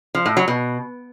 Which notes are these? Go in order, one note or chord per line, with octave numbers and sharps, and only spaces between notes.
F3
A2
F#3
B2